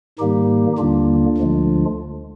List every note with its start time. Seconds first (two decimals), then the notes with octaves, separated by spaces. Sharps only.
0.19 G#2 D#3 G3 A#3 D#4 G4
0.78 D#2 D3 G3 A#3 D4 F4
1.37 D2 D3 F3 G#3